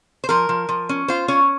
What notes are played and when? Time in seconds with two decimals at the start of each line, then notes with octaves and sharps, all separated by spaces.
0.24 C5
0.29 F3 A#4
0.49 F3
0.69 F3
0.89 C#4
1.08 F4 C5
1.28 C#4 C#5